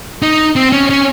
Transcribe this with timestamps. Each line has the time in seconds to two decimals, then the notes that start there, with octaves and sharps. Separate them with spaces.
0.22 D#4
0.56 C4
0.72 C#4
0.90 C#4